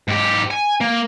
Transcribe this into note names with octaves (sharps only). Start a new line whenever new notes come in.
G#2 G4
G#5
A#3